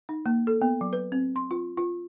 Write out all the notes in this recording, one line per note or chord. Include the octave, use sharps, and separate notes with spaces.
D#4
A#3
A4
B3
F#3
B4
C4
C6
F4
F4